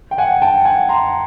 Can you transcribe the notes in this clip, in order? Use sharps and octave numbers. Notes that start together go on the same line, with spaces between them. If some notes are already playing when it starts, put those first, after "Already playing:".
G5
F#5 G#5
G5 A5
F#5 G#5
A#5 C6